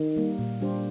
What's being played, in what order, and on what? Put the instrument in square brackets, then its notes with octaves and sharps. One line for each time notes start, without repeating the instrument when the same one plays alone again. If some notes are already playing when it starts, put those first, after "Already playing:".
Already playing: [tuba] D#3
[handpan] G3 A#3
A#2
G3 D4 G4 C5